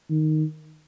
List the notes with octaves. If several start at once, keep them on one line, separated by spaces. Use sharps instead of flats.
D#3